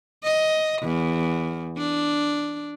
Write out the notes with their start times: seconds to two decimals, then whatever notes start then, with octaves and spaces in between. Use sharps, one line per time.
0.24 D#5
0.83 E2
1.77 D4